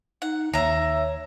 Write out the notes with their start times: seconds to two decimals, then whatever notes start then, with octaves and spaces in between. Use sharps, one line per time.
0.22 D#4 F#5
0.54 D#2 C#5 E5 A#5